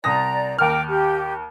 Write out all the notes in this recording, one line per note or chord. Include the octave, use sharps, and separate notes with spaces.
C2 D5 A#5 D#6 A#6
D#2 A#4 G5 D6 F6
G4